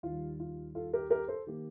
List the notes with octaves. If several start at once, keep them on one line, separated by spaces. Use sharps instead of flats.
D#2 D#3 G3 F4
F4
F4 A4
G4 A#4
G4 A#4
A4 C5
D#3 A#3 G4